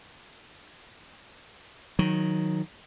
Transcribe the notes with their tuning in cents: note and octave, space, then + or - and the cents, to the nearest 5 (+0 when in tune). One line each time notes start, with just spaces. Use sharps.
D#3 +0 F#3 -15